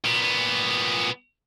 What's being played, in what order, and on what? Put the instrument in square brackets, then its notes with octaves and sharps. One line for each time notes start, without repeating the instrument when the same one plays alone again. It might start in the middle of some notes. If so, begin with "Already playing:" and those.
[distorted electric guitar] A#2 B3